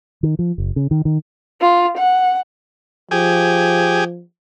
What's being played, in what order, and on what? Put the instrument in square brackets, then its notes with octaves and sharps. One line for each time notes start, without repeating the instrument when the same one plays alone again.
[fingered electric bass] D#3
F3
F#1
C#3
D#3
D#3
[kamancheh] F4
F#5
[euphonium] F3 [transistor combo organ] G4 G#4